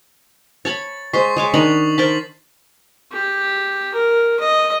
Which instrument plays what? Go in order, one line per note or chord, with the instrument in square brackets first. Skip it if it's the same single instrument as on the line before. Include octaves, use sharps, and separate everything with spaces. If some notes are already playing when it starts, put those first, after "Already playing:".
[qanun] C#5 A5 B5 [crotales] A6
[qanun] G#3 C5 [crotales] C#6 B6 C7
[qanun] G#3 C#5 D6
[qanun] D#3 D4 D#4 [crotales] F7 F#7
[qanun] A#4 C5 A5 [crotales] A6 B6
[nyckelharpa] G4
A#4
D#5